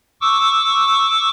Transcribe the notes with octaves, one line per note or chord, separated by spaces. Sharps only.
C#6 D6 E6